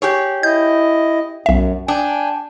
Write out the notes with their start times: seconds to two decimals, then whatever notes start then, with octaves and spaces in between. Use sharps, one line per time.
0.02 G4 G#4 C#5
0.43 E4 D#5 G6
1.46 B1 F#2 E5
1.88 D4 G5 G#5